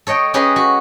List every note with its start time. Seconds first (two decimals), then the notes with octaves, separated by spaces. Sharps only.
0.07 A4 C#5 D#5 G5
0.34 C#4 G4 G#4 B4 D#5
0.56 F#4